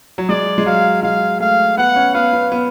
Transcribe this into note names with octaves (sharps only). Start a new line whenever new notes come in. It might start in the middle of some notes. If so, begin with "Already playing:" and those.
F#3
G#3 D5
G#3
F#3 F5
G#3 F5
A3 F5
B3 F#5
C#4
B3 F5
B3
B3